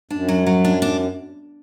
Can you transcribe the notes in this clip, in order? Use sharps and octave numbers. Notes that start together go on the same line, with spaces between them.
F#2 D4
F#3
F#3
D4
D4